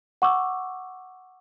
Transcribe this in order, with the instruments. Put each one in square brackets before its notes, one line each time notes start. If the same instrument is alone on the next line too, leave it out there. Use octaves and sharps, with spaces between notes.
[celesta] F#5 C#6 D6 E6